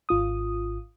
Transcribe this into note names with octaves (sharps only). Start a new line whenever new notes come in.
G#1 F4 D#6